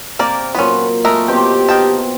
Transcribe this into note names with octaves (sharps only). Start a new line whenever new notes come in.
C3 A#3 A#4 D5
A#2 F#3 B3 C#4 F4
G#3 A3 A#4
B2 C4 G4
D#3 G5 A5